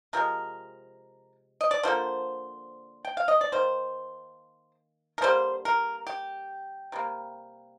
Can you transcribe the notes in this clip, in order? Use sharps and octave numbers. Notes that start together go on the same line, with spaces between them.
C3 F3 G#3 A#4
D#5
D5
D3 F3 A#3 C5
G5
F5
D#5
D5
D#3 A#3 C5
A#4
D3 G3 A#3 C5
A#4
G4
C3 G3 A#3